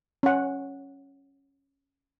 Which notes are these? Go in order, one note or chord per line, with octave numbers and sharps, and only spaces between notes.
C#4 F#5